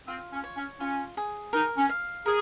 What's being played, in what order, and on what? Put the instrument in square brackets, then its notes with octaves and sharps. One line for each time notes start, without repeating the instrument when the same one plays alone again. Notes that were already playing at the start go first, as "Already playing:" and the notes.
[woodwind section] C4 [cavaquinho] F4
[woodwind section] C#4
[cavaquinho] C#5
[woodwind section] C#4
[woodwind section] C#4 [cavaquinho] F4
[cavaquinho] G#4
[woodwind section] D#4 [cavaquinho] A#4
[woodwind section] C#4
[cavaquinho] F5
[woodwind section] G#4 [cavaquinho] A#4